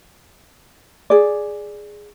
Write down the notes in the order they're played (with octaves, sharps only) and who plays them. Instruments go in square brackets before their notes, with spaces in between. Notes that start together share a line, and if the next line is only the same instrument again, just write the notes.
[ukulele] G#4 D5